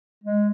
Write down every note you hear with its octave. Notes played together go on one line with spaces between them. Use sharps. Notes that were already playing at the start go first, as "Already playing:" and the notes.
G#3